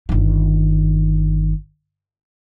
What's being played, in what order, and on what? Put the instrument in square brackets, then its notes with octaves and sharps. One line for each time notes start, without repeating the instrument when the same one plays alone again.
[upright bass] G1 D#3